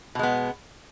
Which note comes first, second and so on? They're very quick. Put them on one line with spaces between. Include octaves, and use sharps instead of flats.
B2 G#3 B3